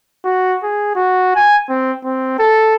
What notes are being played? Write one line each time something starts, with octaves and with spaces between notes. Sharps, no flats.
F#4
G#4
F#4
G#5
C4
C4
A4